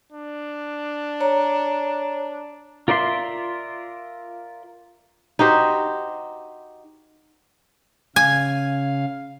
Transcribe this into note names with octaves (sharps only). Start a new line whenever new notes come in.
D4
C#5 A#5
F4 A#4 D5 E5 C6
D#4 F#4 G4 C5
C#3 F5 G#5